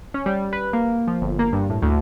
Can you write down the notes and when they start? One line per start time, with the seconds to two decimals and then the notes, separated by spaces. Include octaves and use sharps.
0.14 C#4
0.26 G3
0.53 B4
0.73 A#3
1.08 F3
1.21 G1
1.39 A#3
1.53 G2
1.70 A2
1.82 D2